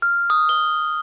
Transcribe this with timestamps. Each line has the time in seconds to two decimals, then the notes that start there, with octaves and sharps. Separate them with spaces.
0.02 F6
0.30 D#6
0.49 G7